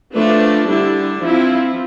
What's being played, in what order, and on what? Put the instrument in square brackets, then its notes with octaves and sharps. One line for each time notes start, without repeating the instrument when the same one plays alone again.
[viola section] F3 A3 D4 B4
D3 G3 D4 E4
F3 C4 E4